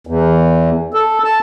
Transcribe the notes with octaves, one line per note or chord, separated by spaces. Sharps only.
E2
A4
A5